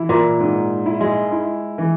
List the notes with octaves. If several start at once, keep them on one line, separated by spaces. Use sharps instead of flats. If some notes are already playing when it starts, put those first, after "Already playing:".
Already playing: E3 E4
A#2
G#2
E4
G#3
E4
E3